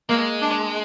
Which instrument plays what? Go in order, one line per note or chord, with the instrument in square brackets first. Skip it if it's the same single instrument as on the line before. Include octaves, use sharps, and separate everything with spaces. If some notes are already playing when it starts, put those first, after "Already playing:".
[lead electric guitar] G#3 [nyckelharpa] A#3
[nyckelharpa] D4